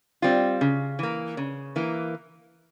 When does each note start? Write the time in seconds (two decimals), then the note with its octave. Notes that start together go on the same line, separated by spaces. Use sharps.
0.22 G3 C4 F4
0.61 C#3
0.99 E3 A#3
1.37 C#3
1.76 E3 A#3